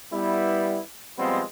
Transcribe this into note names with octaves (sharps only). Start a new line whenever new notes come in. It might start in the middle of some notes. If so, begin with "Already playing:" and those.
G3 B3 E4
B2 F3 G3 G#3 B3 C4